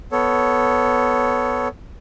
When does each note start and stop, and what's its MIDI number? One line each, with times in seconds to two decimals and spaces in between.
0.12 1.68 59
0.12 1.68 69
0.12 1.68 73